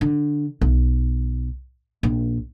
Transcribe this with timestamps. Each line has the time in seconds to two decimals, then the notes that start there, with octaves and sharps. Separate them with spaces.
0.01 D3
0.61 B1
2.03 A#1